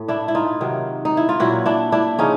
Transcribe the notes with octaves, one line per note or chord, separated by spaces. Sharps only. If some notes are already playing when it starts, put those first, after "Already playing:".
Already playing: A2
D4 E4
E4
D#4 F4
C3 D#3 F#3
D#4
E4
F4
A#2 F#3 E4 F#4
D4 E4
D4 E4
C#3 F3 C#4 D#4